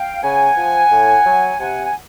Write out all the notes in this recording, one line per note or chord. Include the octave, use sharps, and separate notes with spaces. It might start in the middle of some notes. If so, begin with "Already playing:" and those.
Already playing: F5 G5
C#3 F#5 G#5
F3
A2
F#3
C3 F#5 G#5
G#5